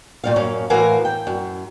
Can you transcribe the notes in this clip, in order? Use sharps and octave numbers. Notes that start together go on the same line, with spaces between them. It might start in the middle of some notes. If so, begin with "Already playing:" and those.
A#2 G3 F5
F#2 A#3 C#4 F5
A2 E3 F#4 A#4 F5 G#5
G5
F#2